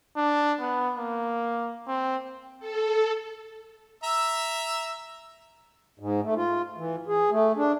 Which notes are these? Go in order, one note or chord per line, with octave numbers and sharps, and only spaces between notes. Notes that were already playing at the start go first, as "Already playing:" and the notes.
D4
B3
A#3
C4
A4
E5 A#5 E6
G#2
A3
F4
E3
G#4
A3
D4